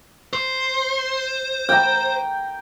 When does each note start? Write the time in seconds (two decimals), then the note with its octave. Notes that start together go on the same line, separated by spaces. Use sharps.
0.33 C5
1.69 G5 A#5